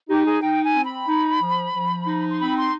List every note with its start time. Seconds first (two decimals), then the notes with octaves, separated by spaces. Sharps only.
0.09 D#4 G4
0.26 G#4
0.42 D#4 G5
0.64 G#5
0.75 C4
0.86 B5
1.08 D#4
1.42 F3
1.74 F3
2.07 D#4
2.30 C6
2.40 C4 B5
2.57 C6